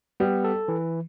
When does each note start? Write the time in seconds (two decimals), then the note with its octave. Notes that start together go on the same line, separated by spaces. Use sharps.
0.20 G3 B3
0.44 A4
0.68 E3